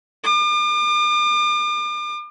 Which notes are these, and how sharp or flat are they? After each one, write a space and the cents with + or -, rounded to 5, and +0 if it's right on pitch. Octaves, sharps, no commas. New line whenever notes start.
D6 +40